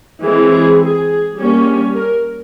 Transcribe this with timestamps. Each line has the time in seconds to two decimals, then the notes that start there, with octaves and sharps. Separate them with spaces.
0.23 E3 G#3 C4 G#4
0.52 G#4
0.81 G#4
1.38 G3 A#3 C#4
1.95 A#4